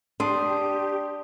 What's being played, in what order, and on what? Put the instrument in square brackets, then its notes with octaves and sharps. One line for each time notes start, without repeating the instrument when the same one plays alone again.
[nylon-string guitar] D4 [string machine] G4 [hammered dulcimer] C6 [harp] D#6